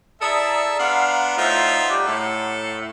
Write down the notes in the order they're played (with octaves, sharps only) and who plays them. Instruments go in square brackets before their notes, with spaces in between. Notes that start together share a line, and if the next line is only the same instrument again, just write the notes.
[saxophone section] E4 G#4 A4 [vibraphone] D5 A#5 D#6 [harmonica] E5 A5
[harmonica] B3 D4 [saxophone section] F5 [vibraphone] F#5 A#5 C6
[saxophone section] A2 F3 A3 [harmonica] D#4 F4 E5
[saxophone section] G3 D4
[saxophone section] A2 [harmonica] A4